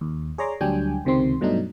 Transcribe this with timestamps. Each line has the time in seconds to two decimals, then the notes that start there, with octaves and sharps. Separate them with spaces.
0.01 D#2
0.38 G#4 C#5 D5 A#5 C6 D6
0.61 D2 F#3 G3 D4 G5 G#5
1.05 C#2 C3 D#3 C4 C6
1.41 G2 B2 F#3 A3 D4 D#4